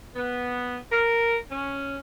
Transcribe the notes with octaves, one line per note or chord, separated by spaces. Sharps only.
B3
A#4
C#4